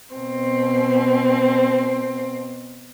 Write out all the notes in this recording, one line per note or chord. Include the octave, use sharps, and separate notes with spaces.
B2 C4